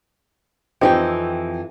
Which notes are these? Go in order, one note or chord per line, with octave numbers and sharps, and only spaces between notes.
F2 E3 C4 D#4 G4 G5